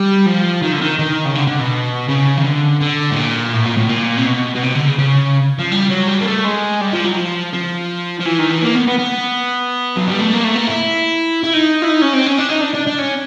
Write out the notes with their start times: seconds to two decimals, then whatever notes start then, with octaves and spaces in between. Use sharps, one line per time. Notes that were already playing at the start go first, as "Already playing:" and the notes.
Already playing: G3
0.26 F3
0.63 D#3
0.73 D3
0.82 D#3
0.99 D#3
1.25 C#3
1.35 D3
1.47 D3
1.60 B2
2.09 C#3
2.37 D#3
2.44 D3
2.80 D3
3.11 A2
3.17 A#2
3.53 A2
3.65 A#2
3.77 A2
3.89 A#2
4.17 C3
4.26 B2
4.55 B2
4.63 C3
4.74 D3
4.87 C#3
4.98 C#3
5.59 F3
5.72 G3
5.90 F#3
6.08 G3
6.21 A#3
6.27 A3
6.45 G#3
6.81 G3
6.93 F3
7.04 F#3
7.17 F3
7.53 F3
8.20 F3
8.25 E3
8.39 D#3
8.50 E3
8.62 A#3
8.74 B3
8.87 B3
8.98 B3
9.97 F#3
10.08 G3
10.19 A3
10.33 A#3
10.44 A3
10.56 A#3
10.68 E4
11.44 E4
11.53 D#4
11.82 E4
11.89 D#4
12.02 C#4
12.13 C4
12.27 C#4
12.39 D4
12.50 D#4
12.62 D4
12.75 D4
12.87 D4
12.99 C#4